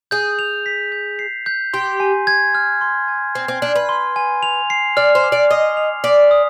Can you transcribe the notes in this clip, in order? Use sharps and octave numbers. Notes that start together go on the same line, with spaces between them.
G#4 G6
F7
B6
G6
C7
G6
G4 C6
G#5
G#6
F6
C6
G#5
C4 C7
C4
D4 F6
B4
C6
G#5
F7
C7
D5 F6
C5
D6
D5
D#5 D#6
F7
D5 B6
D#6